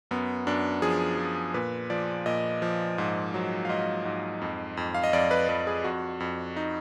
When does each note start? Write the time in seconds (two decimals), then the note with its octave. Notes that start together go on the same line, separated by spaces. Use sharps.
0.11 F#2 B3
0.47 F#2 D4
0.82 F3 G#4
1.18 F3
1.54 A#2 B4
1.90 F3 D5
2.26 A#2 D#5
2.62 F3
2.98 G#2
3.34 F#3
3.65 F5
3.69 G#2 D#5
4.05 G#2
4.41 F2
4.77 F2
4.94 F5
5.04 D#5
5.13 F2 D5
5.31 B4
5.49 F2 B4
5.67 G#4
5.84 F2 F#4
6.20 F2
6.56 D#4